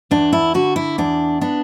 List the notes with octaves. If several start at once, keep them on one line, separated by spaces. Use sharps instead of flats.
E2 D4
E4
D3 F#4
E4
E2 D4
B3 D4